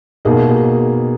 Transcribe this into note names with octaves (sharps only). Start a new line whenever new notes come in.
B2 A#3 D#4 G#4